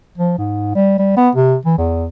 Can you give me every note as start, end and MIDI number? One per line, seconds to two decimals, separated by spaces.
0.18 0.33 53
0.38 0.73 44
0.75 0.95 55
0.99 1.12 55
1.17 1.30 59
1.35 1.56 48
1.65 1.77 52
1.78 2.07 40